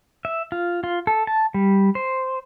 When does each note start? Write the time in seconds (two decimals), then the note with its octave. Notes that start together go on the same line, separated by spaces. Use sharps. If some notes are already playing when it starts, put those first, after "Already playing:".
0.25 E5
0.52 F4
0.84 F4
1.07 A4
1.27 A5
1.54 G3
1.95 C5